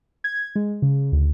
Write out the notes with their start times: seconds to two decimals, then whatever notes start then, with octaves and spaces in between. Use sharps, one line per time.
0.24 G#6
0.56 G#3
0.82 C#3
1.12 D2